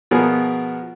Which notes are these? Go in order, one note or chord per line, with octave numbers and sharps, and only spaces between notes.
B2 F3 B3 G#4 A#4